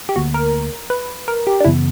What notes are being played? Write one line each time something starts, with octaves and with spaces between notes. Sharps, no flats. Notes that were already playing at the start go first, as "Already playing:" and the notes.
G4
D2 D3 A#3 F#4
A#4
B4
A#4
G4
D4
F#2 C#3 E3 B3 E4